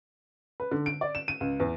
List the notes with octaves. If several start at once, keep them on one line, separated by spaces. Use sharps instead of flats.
B4
D3
D7
D5
E7
D#7
C#2
E2